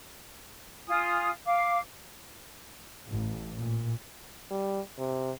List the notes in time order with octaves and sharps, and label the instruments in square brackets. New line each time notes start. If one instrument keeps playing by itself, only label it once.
[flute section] F4 G#5 D#6
F5 D6
[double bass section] A1
A#2
[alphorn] G3
C3